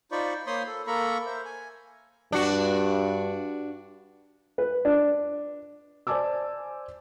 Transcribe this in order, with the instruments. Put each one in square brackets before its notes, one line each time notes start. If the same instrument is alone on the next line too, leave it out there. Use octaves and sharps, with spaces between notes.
[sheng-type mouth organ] D#4 F4 C5 D5 B5 C#6
A#3 C5 C#5 B5 C6 D#6
A4
A#3 A4 A#4 A#5 B5 C#6
C5 E5
G#5
[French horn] G2 [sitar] D4 F#4
[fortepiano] B4
D4
[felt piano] C5 D5 G#5 A5 D6 E6